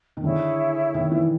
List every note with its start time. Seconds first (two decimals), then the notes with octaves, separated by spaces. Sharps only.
0.17 D#3
0.23 D3 E4 G#4 C#5
0.94 D#3
1.11 E3